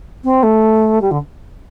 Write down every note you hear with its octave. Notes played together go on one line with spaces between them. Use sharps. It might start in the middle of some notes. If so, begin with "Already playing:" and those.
C4
A3
G3
D3